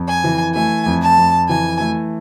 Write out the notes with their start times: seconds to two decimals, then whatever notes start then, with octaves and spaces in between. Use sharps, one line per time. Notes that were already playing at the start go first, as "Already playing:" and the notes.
Already playing: F2
0.08 G#5
0.24 E3
0.55 A3 G#5
0.86 F2
1.02 A5
1.18 F2
1.49 E3 G#5
1.80 A3